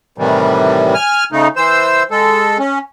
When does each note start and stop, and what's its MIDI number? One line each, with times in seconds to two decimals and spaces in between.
0.18 0.94 45
0.18 0.94 48
0.18 0.94 51
0.18 0.94 52
0.18 0.94 55
0.94 1.24 80
0.94 1.24 89
1.32 1.48 49
1.32 1.48 57
1.32 1.48 63
1.56 2.03 52
1.56 2.03 72
1.56 2.03 88
2.11 2.58 56
2.11 2.58 69
2.59 2.79 61